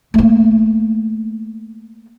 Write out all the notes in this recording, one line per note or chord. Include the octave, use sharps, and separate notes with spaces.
A3 A#3